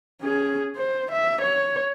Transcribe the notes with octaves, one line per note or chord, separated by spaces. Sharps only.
C#4 G#4
C5
E5
C#5